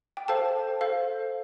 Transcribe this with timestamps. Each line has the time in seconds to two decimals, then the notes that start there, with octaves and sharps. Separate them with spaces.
0.17 G5
0.28 A4 C5 F5 A5
0.81 A4 C5 F5